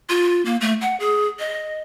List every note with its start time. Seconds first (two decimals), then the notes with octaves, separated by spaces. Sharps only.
0.09 F4
0.45 A#3
0.61 A3
0.81 F#5
1.00 G#4
1.39 D#5